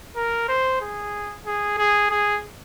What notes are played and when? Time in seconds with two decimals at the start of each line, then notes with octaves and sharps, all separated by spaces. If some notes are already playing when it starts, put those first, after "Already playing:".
0.16 A#4
0.49 C5
0.82 G#4
1.46 G#4
1.78 G#4
2.10 G#4